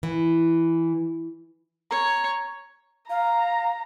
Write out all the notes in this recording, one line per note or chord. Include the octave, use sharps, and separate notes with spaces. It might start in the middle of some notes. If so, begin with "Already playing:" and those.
E3
C#5 A#5
F5 A#5